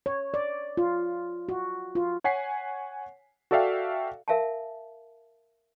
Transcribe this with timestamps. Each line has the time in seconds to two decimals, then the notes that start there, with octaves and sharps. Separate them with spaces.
0.06 C#5
0.34 D5
0.77 F4
1.49 F#4
1.95 F4
2.24 C#5 F#5 G#5 B6 C7
3.51 F#4 A4 D5 E5 F5 G5
4.28 A#4 E5 F5 G#5 A5